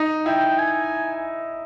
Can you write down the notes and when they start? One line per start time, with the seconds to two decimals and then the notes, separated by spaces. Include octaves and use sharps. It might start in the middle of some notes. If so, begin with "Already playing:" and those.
Already playing: D#4
0.26 E4 G5
0.59 G#5